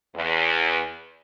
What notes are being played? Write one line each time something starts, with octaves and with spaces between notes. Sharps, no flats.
E2